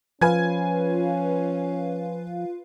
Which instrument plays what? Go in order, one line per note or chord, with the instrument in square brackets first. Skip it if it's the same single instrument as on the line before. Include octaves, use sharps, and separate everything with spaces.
[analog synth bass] F3 [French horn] C#4 [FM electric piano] F4 B4 F5 [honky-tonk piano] G#5 G#6